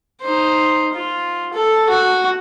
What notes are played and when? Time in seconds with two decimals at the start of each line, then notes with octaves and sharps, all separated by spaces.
0.22 D#4 C5
0.94 F4
1.53 A4
1.89 F#4